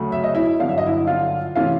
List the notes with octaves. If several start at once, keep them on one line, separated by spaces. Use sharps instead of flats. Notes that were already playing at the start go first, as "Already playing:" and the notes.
Already playing: D2 C#3 F#3 A3
E5
D#5
E4 E5
G1 F#2 D3 F5
E5
D#5
E4 E5
F4 F5
C3 E3 A3 C#4 F4 F5